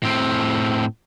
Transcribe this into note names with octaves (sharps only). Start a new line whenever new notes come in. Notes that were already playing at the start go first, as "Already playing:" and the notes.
A2 C4